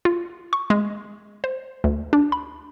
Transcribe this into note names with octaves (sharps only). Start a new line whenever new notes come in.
F4
C#6
G#3
C5
D2
D4
B5